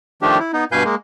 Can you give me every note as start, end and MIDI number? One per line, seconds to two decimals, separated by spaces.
0.22 0.39 51
0.22 0.39 53
0.22 0.39 57
0.22 0.39 62
0.22 0.39 67
0.39 0.52 64
0.53 0.65 59
0.53 0.65 63
0.72 0.83 43
0.72 0.83 47
0.72 0.83 71
0.72 0.83 77
0.72 0.83 80
0.72 0.83 91
0.84 0.95 56
0.84 0.95 58